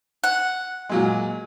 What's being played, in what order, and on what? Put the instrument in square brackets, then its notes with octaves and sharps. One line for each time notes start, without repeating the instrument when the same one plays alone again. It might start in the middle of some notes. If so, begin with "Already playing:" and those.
[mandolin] F#5
[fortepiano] A#2 F#3 G#3